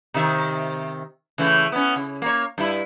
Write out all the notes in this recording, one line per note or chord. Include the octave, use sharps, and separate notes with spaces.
C3 D#3 E5
C#3 E3 A3
B3 C#4
C#3
A#3 C#5
G2 E4